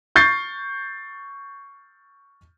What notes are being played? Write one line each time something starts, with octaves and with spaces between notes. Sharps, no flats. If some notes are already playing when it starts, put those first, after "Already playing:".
C#6 G6 A6 C7